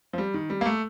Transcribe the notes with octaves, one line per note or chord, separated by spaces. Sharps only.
F3
G3
D#3
G3
A#3
A3